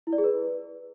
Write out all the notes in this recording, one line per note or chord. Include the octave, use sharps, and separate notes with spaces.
E4
D5
G#4
B4